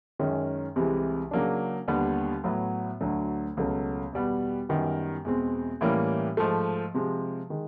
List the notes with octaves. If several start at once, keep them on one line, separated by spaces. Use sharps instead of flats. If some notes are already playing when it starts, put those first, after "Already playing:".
F#2 D#3 G#3 C#4
C2 C3 E3 G#3
C#3 F#3 A#3 D4
D#2 D3 G3 B3
A2 F#3 B3
D2 D3 F#3
C#2 B2 F#3 A3 C#4
E2 B2 G3 B3
F#2 D#3 G3 B3
E2 B2 G#3 C4
A2 E3 G3 A#3 C#4
G#2 F3 A3
C3 F3 G#3
D#3 G#3